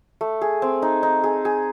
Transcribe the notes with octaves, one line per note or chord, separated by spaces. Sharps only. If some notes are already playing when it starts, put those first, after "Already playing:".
A3
G#4
C4
D#4
D#4
G#4
G#4